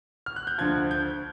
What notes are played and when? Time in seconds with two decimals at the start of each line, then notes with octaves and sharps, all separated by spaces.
0.26 F6
0.36 F#6
0.47 G6
0.58 D2 D3 F3 G#6
0.91 G6